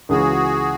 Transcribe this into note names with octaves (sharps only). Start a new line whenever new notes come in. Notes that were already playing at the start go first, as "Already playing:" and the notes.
C#2 C#3 E3 G#3 F#4 G#4